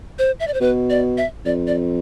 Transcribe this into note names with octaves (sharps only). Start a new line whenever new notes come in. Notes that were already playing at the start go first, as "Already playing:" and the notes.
C5
E5
D5
C5
B2 B4
D5
E5
F2 D5
D5